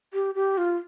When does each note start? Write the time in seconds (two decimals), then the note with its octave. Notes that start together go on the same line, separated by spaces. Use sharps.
0.14 G4
0.35 G4
0.58 F4